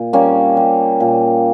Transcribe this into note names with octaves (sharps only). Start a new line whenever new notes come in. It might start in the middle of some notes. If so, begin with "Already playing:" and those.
Already playing: A#2
G3 A#3 C#4
G3
A#2